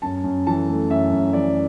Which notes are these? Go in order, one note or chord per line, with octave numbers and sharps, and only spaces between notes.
F#2 A5
F#2
E3 A5
A3
F#2 E5
F#2
E3 D5